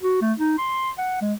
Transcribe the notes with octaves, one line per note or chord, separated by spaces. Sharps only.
F#4
A3
D#4
C6
F#5
G#3